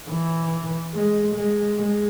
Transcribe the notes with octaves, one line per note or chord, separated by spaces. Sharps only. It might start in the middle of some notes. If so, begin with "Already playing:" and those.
E3
G#3
G#3
G#3